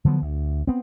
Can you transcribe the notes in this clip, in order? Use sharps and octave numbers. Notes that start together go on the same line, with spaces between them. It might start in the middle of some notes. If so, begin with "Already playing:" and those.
D3 F3 F#3 B3
D2
B3 C4